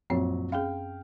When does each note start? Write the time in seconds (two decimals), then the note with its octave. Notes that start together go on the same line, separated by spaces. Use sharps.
0.10 A#1 F#2 F#3 C4 C#5
0.52 C#4 G#4 F5 G5